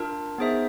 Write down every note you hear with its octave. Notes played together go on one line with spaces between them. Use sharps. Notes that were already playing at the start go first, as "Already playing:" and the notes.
Already playing: D4 F4 A#4
B3 D#4 G#4 C5 E5